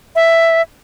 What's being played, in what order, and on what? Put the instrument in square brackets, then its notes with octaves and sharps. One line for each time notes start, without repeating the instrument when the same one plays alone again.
[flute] E5